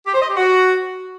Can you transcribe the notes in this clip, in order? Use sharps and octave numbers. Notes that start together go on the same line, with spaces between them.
G4
C5
D#5
G4
F#4